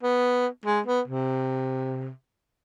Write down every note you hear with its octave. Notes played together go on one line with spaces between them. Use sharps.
B3
G#3
B3
C3